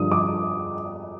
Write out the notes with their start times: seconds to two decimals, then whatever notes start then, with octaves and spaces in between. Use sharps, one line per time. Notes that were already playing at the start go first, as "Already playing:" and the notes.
Already playing: G2 D3 F3 D#6
0.12 D6